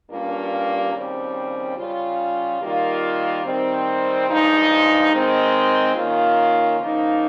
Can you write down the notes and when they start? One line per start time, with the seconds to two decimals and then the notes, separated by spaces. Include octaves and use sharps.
0.10 G2 G3 A#3 C#4 F4
0.93 D#2 C#3 G3 C4
1.77 C#3 G3 C#4 F4
2.61 D#3 G3 A#3 F4
3.44 D#3 G3 C4
4.28 G2 F3 G#3 D#4
5.12 D#3 G#3 C4 D#4
5.95 D#3 A#3 C#4 F4
6.80 C#3 F3 A#3 D#4